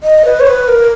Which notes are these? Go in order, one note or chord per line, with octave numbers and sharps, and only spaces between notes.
D#5
B4
C#5
B4
A#4